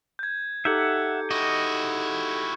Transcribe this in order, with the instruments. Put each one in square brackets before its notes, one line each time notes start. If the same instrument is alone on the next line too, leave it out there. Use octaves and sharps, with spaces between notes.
[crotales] G6 G#6
[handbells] D#4 G4 A4 [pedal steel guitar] E5 F#5 [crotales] G6 G#6 C#7
[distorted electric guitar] E4 F#4 [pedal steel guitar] D#5